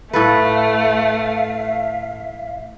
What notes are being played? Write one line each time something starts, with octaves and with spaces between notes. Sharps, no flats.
A2 A3 A4 B4 E5 F5